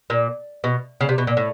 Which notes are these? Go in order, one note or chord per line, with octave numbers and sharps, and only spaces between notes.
A#2
B2
C#3
C3
B2
A#2
A2